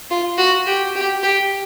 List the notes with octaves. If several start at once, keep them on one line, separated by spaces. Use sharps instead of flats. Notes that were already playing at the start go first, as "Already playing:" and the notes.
F4
F#4
G4
G4
G4